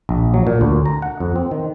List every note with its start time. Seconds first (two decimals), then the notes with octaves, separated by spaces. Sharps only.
0.09 A#1
0.34 F#3
0.47 A#2
0.61 D2
0.86 A#5
1.02 F#5
1.20 F2
1.36 C4
1.51 D#3